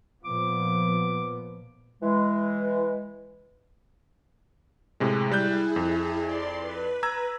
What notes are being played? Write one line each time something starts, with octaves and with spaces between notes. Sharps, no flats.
A#2 F3 B3 D6
E3 G#3
A2 C3 G#3
G3 E4 G#4 F#6 G6
F2
D5 C6
B4
A#5 E6 G#6